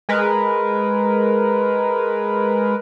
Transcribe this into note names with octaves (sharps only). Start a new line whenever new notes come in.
G#3 A#4 B4